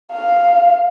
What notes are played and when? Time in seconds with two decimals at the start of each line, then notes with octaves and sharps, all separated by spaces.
0.12 F5